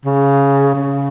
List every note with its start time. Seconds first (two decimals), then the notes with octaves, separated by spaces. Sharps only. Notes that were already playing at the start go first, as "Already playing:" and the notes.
0.05 C#3
0.75 C#3